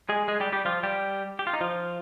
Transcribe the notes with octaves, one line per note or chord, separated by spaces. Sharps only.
G#3 G#4
G#3 G#4
G3 G4
G3 G4
F3 F4
G3 G4
G4
F4
D#4
F3 F4